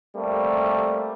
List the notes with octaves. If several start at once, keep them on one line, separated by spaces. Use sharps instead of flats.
G3 A3 A#3 C4